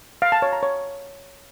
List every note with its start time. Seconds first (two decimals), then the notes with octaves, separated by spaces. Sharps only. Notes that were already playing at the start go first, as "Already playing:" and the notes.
0.22 F5
0.32 A5
0.42 C#5
0.53 A#5
0.63 C#5